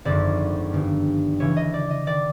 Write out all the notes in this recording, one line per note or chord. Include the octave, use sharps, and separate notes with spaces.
G#1 F#2 D3 F3 D5
G1 G2 D#3
C#2 C#3 E3 C#5
D#5
D5
D#5
D#3 D5